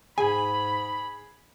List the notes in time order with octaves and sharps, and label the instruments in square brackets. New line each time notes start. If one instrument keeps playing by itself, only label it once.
[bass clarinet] G#2 [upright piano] G#4 [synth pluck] G#5 [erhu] B5